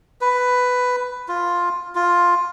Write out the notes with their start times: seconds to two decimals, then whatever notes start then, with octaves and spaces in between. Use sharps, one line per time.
0.21 B4
1.28 F4
1.95 F4